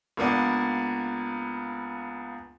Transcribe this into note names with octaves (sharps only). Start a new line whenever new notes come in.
C#2 A#3 B3 D4